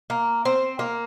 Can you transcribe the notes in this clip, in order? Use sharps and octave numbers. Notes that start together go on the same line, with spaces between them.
A#3
C4
A#3